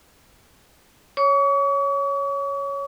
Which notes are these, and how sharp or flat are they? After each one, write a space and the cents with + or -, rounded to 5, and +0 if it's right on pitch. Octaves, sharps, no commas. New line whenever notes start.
C#5 +0 C#6 +40